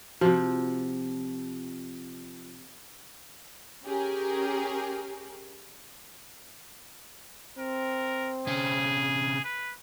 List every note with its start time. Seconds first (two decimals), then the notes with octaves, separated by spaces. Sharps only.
0.21 C3 F3 F4 F#4
3.85 C#4 G4 G#4 A#4
7.58 C4 A#4
8.47 C3 C#4 G#4
9.44 B4